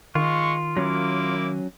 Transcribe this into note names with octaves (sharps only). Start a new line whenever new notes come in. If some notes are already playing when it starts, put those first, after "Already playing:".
D#3 G#3 F4 C#6
F#3 A#3 C#4 E4 D6